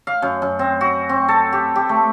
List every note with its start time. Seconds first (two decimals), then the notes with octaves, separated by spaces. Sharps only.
0.07 F5
0.22 F#2
0.42 F#2
0.59 C4
0.81 F#4
1.09 C4
1.29 A4
1.53 G4
1.76 G4
1.89 A3